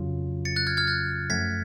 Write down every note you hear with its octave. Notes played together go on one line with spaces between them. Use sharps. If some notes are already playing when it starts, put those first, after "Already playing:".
Already playing: F2 C#3 F#3 C#4 F4
A6 C#7
F#6 A6
F6 G#6
F6 G#6
F#6 A6
F#2 F3 A3 G#6 B6